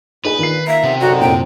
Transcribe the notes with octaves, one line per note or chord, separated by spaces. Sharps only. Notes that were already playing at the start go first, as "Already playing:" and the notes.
A#2 D#4 G#4 B4
D#3 F4 C7
A#3 E5 A#5
C3 B3
F#2 D3 D#4 F#4
F#1 A#2 G5